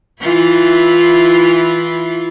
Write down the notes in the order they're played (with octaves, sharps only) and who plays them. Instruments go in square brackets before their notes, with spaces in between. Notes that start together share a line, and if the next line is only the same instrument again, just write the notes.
[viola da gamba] E3 E4 F4